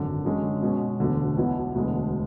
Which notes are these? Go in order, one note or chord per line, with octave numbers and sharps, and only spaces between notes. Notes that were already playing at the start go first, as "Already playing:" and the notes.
Already playing: G#1 F#2 D3
F#2 D3 G#3 C#4
B2 G#3 C#4
E1 D2 D3
B1 B2 F#3 B3 E4
E1 D2 D3 G#3